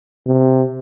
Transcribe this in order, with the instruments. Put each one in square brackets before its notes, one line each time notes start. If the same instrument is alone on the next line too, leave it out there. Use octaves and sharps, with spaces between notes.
[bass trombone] C3